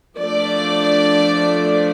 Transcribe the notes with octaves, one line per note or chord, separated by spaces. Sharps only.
F3 A3 D4 D5